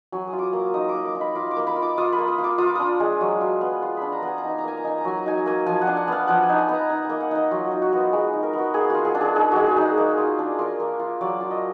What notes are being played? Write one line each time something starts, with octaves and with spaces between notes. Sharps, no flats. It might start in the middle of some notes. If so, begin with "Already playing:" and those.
F#3 G#5
D#6
F4
D6 D#6
A#3
D6
D#4 D#6
D6 D#6
A#3
D6
D#4
B5
F4 D6
D6
A#3
B5
F4
D6
F4 D#6
B5
A#3
D#6
F4
D6
F4 D#6
D6
D4 D#6
G#3
F#3
F4
B3
F4
D4 B5
A#5
B3 G#5
A#5
D#4 G#5
A#5
A#3 G#5
A#5
D#4 G#5
A#5
F#3 G#5
A#5
D#4 G#5
A#5
A#3 G#5
F3 G#5
F#5
D4
F#5
B3 F5
F3 F#5
G#5
D#4
G#5
B3
A#5
D#4 A#5
A#3 G#5
F#5
D#4 D#5
F#3 F4
F#4
D#4
F#4
B3 F4
G#3 F#4
D#4
A#4
B3 F#4
A#3 G#4
F4 F#4
G#4
D4
G#4
D#4 G#4
G#3 F#4
G#4
D#4 G#4
A#3
F4
D4
F4 A#4
A#3
F4
F#3 D5
F4
D#5